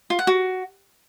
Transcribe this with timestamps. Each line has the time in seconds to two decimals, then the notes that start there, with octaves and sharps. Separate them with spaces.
0.10 F4
0.19 F#5
0.27 F#4